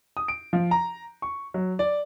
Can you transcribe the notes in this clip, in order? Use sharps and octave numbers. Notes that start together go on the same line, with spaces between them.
D#6
D7
F3
A#5
C#6
F#3
D5